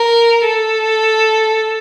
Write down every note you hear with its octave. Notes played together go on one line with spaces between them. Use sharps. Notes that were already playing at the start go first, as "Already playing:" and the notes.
Already playing: A#4
A4